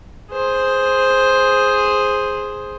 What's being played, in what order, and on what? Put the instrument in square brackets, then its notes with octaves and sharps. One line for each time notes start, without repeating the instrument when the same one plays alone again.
[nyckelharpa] G#4 C5